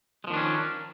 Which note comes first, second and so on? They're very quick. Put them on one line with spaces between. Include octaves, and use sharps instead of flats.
G#3 F3 D#3 D4 C#4